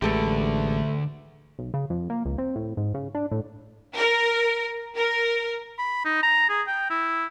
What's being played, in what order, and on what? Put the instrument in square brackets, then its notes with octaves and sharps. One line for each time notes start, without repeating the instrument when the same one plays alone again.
[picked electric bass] A1 G#3 [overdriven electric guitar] D2 D3 [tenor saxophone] A3 [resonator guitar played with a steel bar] G4 A4 B4
[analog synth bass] B1
C#3
F2
A#3
C#2
C4
A2
G#2
C#3
D4
A2
[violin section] A#4
A#4
[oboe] B5
D#4
A#5
G#4
G5
E4